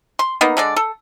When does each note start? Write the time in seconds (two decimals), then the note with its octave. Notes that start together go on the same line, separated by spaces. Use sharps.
0.19 C6
0.41 A#3 B3 D#4
0.57 D3 G#3 D5
0.76 A4